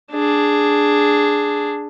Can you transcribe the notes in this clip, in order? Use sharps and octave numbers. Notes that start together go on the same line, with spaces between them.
D4 G#4